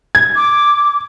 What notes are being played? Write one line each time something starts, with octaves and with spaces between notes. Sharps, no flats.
G#6
D6